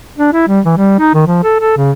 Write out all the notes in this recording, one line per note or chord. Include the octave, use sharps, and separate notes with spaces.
D4
E4
G3
E3
G3
D#4
D#3
F3
A4
A4
C#3